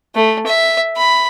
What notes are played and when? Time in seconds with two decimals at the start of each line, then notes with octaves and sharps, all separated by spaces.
0.15 A3
0.46 E5
0.97 B5